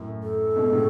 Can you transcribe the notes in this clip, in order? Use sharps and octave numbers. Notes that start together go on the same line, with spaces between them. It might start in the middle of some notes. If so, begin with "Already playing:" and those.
Already playing: F#2 A2
A4
G#2 B2
A2 C#3